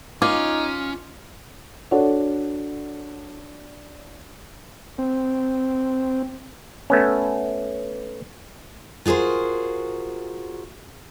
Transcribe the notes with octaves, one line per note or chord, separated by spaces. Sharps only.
C#4 D#4 F4 D6
D4 F#4 A4 C#5 F#5
C4
A3 B3 C#4
F4 F#4 G#4 A#4 C5